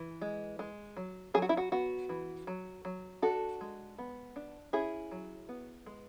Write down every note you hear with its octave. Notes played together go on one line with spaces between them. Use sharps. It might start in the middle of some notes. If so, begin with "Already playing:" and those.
Already playing: E3
G#3
G#3
F#3
F#3 G#4
F#4
E4
F#4
B3 F#4
E3
F#3
F#3
D4 F#4 A4
G#3
B3
D4
C#4 E4 G#4
F#3
B3
G#3